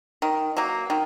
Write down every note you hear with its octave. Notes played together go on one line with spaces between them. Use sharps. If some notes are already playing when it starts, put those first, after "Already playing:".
D#3
F#3 A#3
D#3